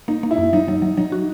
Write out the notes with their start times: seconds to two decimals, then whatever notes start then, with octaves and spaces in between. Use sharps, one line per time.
0.08 A#3 D#4
0.23 A#3
0.31 E4
0.38 F#2
0.53 F#3 D#4
0.68 F#3
0.82 F#3
0.97 F#3 D#4
1.12 F#4